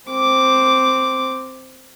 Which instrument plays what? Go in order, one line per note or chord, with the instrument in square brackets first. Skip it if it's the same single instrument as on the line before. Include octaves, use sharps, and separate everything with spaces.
[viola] C4 D6